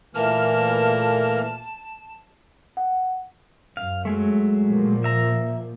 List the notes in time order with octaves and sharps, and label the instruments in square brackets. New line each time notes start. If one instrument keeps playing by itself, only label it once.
[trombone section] A#2 A3 [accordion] E3 F6 [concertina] A#3 [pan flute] A5
[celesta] F#5
[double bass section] F#2 [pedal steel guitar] F5
[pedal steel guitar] F#3 G#3 A3
[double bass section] A#2 F3 A#3
[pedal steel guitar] E5 A#5